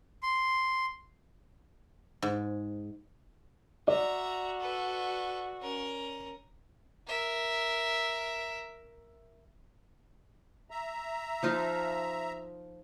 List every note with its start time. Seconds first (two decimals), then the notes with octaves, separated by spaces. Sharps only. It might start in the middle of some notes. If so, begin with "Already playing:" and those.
0.23 C6
2.22 G#2
3.88 F#4 D5 E5 A#5
4.60 A4 B4
5.61 C#4 A#4
7.07 A#4 E5
10.71 E5 A#5
11.43 F3 D#4 F4